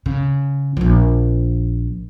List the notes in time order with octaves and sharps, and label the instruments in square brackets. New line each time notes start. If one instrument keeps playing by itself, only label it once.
[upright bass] C#3
A#1 F3